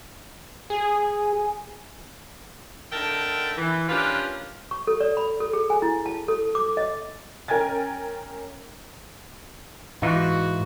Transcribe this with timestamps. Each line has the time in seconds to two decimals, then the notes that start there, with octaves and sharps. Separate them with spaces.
0.70 G#4 G#5
2.92 D3 D#4 A#4 E5 G5 A5
3.58 E3
3.89 C#4 D4 F4 G4 A#4 B4
4.71 C#6
4.87 A4
5.01 D5
5.17 B5
5.40 A4
5.53 G#4
5.70 G#5
5.82 E4
6.06 A5
6.28 A4
6.55 D6
6.77 D#5
7.48 C#4 A#4 G5 G#5 G#6 A6
10.02 G#2 E3 D#4 F4 F#4